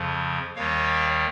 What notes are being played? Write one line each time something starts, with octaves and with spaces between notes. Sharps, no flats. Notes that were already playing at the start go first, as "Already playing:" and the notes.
Already playing: F2 C#3 F3
D#2 D#3 G3 C#5 F5